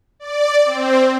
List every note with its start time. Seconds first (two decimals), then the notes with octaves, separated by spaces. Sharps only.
0.19 D5
0.64 C4